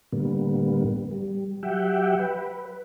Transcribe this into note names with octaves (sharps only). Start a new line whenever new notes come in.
A2 D3 G3 A#3 B3
G3
F#3 G4 E5 F#5 G5
B4